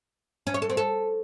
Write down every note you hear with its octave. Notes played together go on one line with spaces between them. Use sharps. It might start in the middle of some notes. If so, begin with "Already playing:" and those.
C#4
C#5
A4
C4
A4